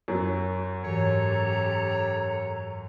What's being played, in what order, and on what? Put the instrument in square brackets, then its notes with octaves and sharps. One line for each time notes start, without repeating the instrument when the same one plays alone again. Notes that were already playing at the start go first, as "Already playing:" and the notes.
[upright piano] F#2 F#3
[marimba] G#2 E3 [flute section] G4 A4 A#5 [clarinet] C#5